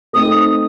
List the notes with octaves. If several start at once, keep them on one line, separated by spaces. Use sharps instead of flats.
A3 C4 D#4 D#6